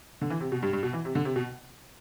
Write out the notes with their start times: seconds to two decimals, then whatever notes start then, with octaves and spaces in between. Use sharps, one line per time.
0.22 D3
0.30 E3
0.41 C3
0.52 B2
0.62 G2
0.73 G2
0.83 B2
0.93 E3
1.05 C3
1.15 D3
1.25 C3
1.36 B2